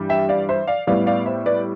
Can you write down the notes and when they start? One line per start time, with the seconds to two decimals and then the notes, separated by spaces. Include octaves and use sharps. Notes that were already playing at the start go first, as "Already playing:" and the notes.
Already playing: G2 E3 G3
0.09 E5 G5
0.29 D5 F5
0.49 C5 E5
0.67 D5 F5
0.87 A2 G3 B3 D5 F5
1.07 D5 F5
1.26 C5 E5
1.46 B4 D5